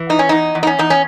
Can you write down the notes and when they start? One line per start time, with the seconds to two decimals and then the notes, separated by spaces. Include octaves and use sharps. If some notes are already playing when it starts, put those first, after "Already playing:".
Already playing: E3
0.09 E2 D#4
0.19 C#4
0.29 E2 D#4
0.55 E2
0.63 D#4
0.67 C#4
0.79 E2 D#4
0.90 C#4